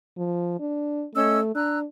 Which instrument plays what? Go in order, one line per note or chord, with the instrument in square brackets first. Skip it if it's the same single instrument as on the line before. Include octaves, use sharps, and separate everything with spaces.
[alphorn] F3
D4
[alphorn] A3 [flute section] C#4 D#5 E6
[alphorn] D4 [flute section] A#5 E6 F#6